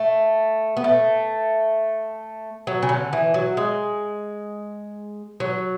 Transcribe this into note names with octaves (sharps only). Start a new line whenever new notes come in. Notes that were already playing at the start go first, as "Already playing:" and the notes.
Already playing: A3
B3
A3
F#3
C#3
D3
E3
F#3
G#3
F#3